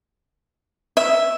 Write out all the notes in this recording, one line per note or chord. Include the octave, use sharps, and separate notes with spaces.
E5